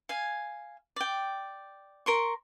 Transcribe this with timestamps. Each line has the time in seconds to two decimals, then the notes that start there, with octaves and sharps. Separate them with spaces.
0.09 F5 G#5
0.96 D5 G5
2.06 A#4 C6 C#6